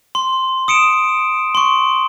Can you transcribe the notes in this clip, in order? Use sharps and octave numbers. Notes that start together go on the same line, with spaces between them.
C6
D#6 C#7 D7 E7
C6 C#6